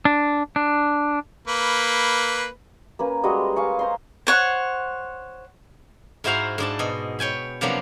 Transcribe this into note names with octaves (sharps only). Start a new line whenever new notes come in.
D4
D4
A#3 B4 B5
A#3 C#4 B4
G3 G#3 F#4 D#5
F5 G#5 C#6
C5 A#5 C6
C5 C#5 F#5
G#2 E4 F#4 C5 F5 A#5
G#2 D4 A5
B2 D#5
C#5 G5 G#5 B5
C3 F3 F#3 A#3 B3 D4